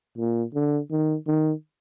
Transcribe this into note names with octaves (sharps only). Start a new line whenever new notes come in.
A#2
D3
D#3
D#3